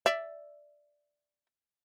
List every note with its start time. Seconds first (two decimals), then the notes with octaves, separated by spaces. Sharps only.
0.06 D5 E5